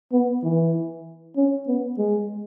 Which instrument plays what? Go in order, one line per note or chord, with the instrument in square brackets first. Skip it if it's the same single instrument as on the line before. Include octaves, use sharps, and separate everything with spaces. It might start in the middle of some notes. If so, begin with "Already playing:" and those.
[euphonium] B3
E3
C#4
B3
G#3